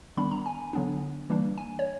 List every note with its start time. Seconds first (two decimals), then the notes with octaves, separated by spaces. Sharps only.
0.17 D#3 G3 B3 D4 B5
0.31 A#5
0.46 G#5
0.73 D3 F#3 B3 D4
1.30 E3 G3 A#3 D4
1.58 G#5
1.79 C#5